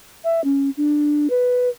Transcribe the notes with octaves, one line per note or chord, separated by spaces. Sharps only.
E5
C#4
D4
B4